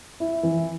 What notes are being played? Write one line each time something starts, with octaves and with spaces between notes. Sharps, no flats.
E4
E3